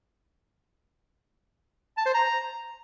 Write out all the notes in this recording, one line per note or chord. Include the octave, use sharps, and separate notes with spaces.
A5
C5
A#5